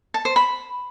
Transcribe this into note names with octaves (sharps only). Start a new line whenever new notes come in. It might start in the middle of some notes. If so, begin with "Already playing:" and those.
A5
C5
B5